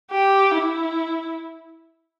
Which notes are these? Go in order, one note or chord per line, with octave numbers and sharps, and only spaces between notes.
G4
E4